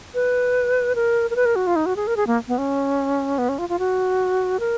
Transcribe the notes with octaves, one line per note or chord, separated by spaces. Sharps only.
B4
A#4
A#4
B4
A#4
F#4
F4
D#4
F#4
G#4
A#4
G#4
A#3
B3
C#4
B3
C#4
F4
F4
F#4
A#4